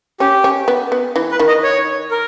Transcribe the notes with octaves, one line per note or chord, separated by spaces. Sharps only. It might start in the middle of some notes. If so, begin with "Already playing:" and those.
C#4 G4
C#4
B3
B3
E3
B4
D#3
D#5
C#5
A#4